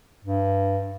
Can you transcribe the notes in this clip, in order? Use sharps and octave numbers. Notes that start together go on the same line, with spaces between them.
G2